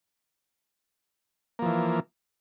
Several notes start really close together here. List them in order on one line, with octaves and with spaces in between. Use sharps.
A#3 F3 E3